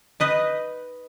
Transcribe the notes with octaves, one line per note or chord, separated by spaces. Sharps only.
D#4 B4 D#5